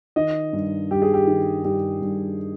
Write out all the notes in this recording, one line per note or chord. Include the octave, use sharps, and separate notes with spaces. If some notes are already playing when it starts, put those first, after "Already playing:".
D#3 D#5
G2
G2 G4
G#4
G4
D#3
G2 G4
G2